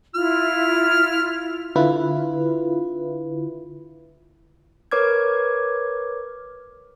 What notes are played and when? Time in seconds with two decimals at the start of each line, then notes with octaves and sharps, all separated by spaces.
0.15 E4 F4 F6
1.76 D3 E4 F4 B4
4.91 A#4 B4 C#5 D6 F6 G#6